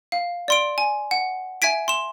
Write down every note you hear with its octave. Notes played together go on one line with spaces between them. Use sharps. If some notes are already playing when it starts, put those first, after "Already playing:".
F5
D5 C6 D7
G#5
F#5
E5 G#5 G#6 B6 D7
C6 E7